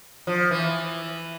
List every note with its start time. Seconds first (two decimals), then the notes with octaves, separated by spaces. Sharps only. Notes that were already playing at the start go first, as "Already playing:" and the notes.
0.27 F3
0.51 E3